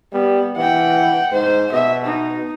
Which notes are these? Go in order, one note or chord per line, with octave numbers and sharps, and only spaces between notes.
G3 B3
E3 F#5 G5
G#2 C5
B2 E5
D#4